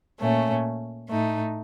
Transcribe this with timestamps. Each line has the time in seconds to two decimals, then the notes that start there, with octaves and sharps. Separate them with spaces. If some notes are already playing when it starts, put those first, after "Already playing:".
0.20 A#2 A3 C#4
1.09 A2 A3 D#4